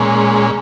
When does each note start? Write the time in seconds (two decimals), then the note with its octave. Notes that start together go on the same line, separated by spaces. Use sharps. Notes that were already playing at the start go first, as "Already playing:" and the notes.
Already playing: A#2 G#3 C#4